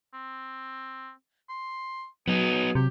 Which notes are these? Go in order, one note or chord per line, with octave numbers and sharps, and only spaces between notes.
C4
C6
F#3 B3 D#4 G#4
C3 G4